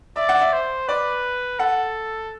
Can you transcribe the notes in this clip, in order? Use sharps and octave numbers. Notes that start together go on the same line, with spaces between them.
D5 E5
F#5
E5
C5
B4 D5
A4 F#5